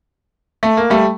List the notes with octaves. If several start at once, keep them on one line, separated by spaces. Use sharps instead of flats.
A3
A#3
G3 A3